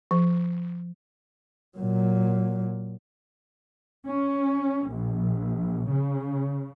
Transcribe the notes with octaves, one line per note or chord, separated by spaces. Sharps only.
F3
A#2 F#3
C#4
A#1
C#3